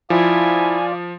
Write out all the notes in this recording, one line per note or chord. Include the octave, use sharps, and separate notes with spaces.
F3 E4 F4 D5 G#5